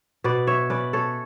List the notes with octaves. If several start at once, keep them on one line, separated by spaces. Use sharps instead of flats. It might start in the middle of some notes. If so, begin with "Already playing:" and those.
B2 B4 D5
C#5 E5
C#4 B4 D5
A4 C#5